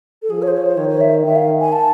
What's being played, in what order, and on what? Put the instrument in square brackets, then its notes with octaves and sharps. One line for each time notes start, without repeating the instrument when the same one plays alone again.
[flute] A4
[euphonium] F3 [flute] G#4
[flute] C#5
C5
C#5
C5
[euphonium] D#3 [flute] C#5
[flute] C#5
E5
[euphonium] D#3 [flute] E5
[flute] F5
G#5
A5